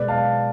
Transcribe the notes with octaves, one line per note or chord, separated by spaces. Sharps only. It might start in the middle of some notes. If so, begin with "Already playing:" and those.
Already playing: B2 G#3 B4 D5
F5 A5